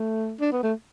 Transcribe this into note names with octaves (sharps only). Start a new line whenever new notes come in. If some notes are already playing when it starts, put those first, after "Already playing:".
Already playing: A3
D4
B3
A3